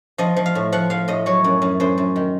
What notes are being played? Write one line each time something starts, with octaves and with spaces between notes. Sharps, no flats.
F3 D#5
F3
F5
A2
F3 F#5
F3 F5
A2 D#5
F#3 C#5
F#2
F#2
F#2 C5
F#2
D#3